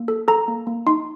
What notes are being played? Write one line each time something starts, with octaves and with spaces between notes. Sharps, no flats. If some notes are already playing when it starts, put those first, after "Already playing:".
Already playing: A#3
A4
A4 A#5
A#3
A#3
D#4 C6